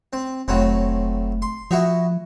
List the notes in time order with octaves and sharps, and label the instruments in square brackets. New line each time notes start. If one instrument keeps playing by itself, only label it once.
[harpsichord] C4
[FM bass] F1 [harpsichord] A2 F#3 C4
[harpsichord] C6
[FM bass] F3 [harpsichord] E4 F#4 D#5